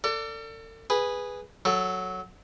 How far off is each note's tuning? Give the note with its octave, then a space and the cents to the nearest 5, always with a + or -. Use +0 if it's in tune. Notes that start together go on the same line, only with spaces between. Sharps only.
A4 +40 D5 -10
G#4 -10 B4 -5
F#3 +0 A4 +0